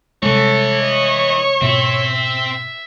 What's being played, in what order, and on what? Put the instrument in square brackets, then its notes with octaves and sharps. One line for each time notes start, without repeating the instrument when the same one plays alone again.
[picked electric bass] C3 G3 G#3 [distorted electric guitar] E3 [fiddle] A4 [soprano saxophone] C#5
[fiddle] D#5
[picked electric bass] G#2 B2 [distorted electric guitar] C4 [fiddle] E5